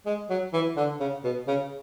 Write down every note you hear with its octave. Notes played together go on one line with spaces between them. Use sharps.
G#3
F#3
E3
D3
C#3
B2
C#3